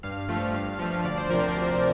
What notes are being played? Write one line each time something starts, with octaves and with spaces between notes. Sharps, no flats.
G2 F5
F3 A3
G2
F3 A3
D2 D5
C5
C3 F3 A#4